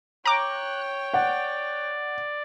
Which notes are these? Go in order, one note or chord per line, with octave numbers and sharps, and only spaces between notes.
C#5 G5 A#5 D6 F#6
D5 F#5